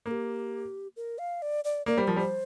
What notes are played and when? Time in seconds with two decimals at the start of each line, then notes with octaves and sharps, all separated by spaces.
0.06 A#3 A#4
0.11 G4
0.96 A#4
1.18 F5
1.42 D5
1.64 D5
1.86 A#3 D5
1.97 G3 C5
2.07 F3 A#4
2.16 G3 C5